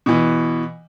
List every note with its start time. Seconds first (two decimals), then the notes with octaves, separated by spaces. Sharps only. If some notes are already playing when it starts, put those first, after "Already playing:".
0.06 B2 E3